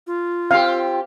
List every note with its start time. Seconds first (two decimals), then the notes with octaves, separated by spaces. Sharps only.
0.07 F4
0.51 C4 G4 F5